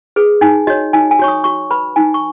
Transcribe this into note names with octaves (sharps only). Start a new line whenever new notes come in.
G#4 B4
D#4 G#5
F#4 C#5 D#5
D#4 G#5
G#5
F#4 C#5 C#6
D#6
F#4 C#6
B4 B5
D#4 G#5
C#6